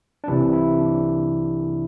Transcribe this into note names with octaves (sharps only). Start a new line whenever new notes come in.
D4
C2 C3 E3 E4
E4
D4